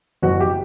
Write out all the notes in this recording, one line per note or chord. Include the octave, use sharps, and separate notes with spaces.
F#1 F#4
G4